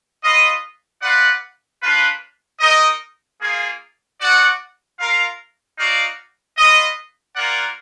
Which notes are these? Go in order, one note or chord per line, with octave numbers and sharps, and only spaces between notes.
F4 B4 D#5
F4 B4 D5 F#5
A#3 D4 F4 B4
D#4 A#4 D#5
A#3 F4 G#4
F#4 D5 F#5
F4 A#4 F5
D#4 F#4 D5 F5
F4 B4 D#5
A#3 F4 A#4 D5 F#5